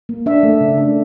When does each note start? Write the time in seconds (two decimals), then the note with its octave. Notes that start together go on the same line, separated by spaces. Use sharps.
0.09 A#3
0.26 D4 E5
0.43 A3
0.61 C#3
0.78 D4